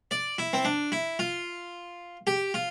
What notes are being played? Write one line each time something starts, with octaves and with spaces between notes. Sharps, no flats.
D5
E4
C4
D4
E4
F4
G4
F4